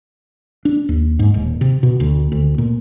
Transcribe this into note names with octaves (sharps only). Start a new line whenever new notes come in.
D4
D#2
G#2
D#1
C3
B2
D2
D2
A#2